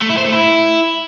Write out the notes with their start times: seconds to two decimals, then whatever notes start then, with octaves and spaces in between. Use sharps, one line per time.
0.02 A3
0.10 E4
0.18 C5
0.26 A3
0.33 E4